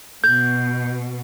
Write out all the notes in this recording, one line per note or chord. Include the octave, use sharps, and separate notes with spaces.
B2 G6